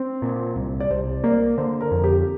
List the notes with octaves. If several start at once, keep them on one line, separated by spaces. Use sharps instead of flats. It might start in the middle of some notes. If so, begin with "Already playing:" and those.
Already playing: C4
A#2
C2
D5
C2 C5
A#3 D5
D3 C5
A#4
F2
G4